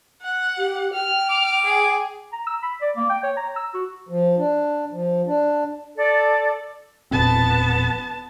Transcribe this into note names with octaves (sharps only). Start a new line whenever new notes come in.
F#5
G4
G5 F6
D6
G#4
A#5
E6
B5
D5
A#3
G5
C#5
A#5
E6
F#4
F3
D4
F3
D4
A4 D5
E1 A#2 B3 C4 A5